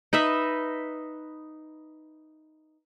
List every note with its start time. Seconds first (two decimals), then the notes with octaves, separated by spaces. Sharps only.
0.13 D#4 B4 D#5 E5